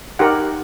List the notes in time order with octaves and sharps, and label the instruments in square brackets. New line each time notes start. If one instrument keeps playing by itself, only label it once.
[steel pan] D#4 G4 A#4 F#5